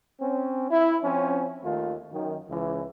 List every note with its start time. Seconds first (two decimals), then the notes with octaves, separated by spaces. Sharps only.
0.21 C4 C#4
0.71 E4
1.03 F3 C4 C#4
1.64 D#2 D#3 A3 F4
2.12 F#2 D#3
2.49 C#2 E3